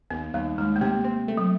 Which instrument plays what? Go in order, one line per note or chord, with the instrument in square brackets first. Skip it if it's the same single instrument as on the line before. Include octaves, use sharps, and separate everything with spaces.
[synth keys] D#2 [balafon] B3
[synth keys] D#2 [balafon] G3
[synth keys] D#2 [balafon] G#3
[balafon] A3
[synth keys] C3 [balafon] A#3
[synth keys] C4
A3
[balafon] F#3